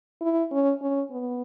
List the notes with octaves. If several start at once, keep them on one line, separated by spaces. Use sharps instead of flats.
E4
C#4
C#4
B3